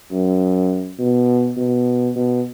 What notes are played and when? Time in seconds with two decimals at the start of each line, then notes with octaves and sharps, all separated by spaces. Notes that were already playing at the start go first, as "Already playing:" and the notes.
0.12 F#2
0.99 B2
1.57 B2
2.15 B2